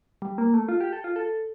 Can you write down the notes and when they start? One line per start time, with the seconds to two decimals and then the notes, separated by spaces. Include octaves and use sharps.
0.22 G3
0.38 A#3
0.54 A3
0.69 F4
0.81 G4
0.93 A4
1.04 F4
1.16 A4